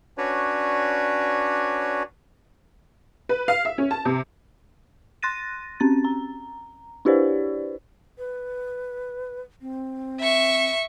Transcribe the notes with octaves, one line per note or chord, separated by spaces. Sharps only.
C#4 D4 F#4 B4 C#5 D5
B4
F5
E5
C#4
A5
C3
C6 F#6 A6 A#6 D#7
C4 C#4 A6
A#5
D4 E4 G4 B4 C5 D5
B4
C4
E5 C#6